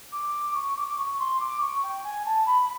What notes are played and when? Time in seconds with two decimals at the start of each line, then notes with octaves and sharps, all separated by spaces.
0.12 D6
0.55 C#6
0.76 D6
0.88 D6
0.98 C#6
1.19 C6
1.40 D6
1.61 C#6
1.83 G5
2.04 G#5
2.25 A5
2.46 B5